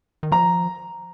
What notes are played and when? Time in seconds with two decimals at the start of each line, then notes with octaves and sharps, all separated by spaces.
0.23 D#3
0.32 F3 A#5